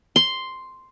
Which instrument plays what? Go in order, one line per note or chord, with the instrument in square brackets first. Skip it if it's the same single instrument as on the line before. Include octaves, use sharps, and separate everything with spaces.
[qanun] C6